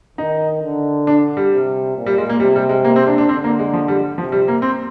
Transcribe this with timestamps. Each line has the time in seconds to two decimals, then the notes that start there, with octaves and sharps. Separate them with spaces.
0.18 D#3 D#4
0.63 D3
1.07 D4
1.37 G3
1.52 C3
1.96 A#2
2.06 G3
2.18 G#3
2.30 A#3
2.40 C3 G3
2.56 G3
2.69 G#3
2.85 A#3
2.96 C4
3.07 D4
3.18 D4
3.29 D3 C4
3.44 A#3
3.59 G#3
3.73 F3
3.88 G3
4.18 C3 F3
4.32 G3
4.48 A#3
4.62 C4